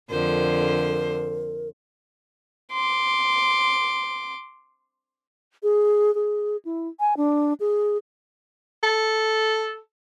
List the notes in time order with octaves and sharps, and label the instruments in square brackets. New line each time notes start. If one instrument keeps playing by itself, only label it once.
[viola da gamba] F2 D3 C5 [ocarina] A#4
[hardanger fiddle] C6 D6
[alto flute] G#4
G#4
E4
G#5
D4
G#4
[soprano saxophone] A4